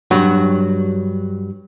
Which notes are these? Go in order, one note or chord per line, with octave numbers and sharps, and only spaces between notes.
G2 F#3 F#4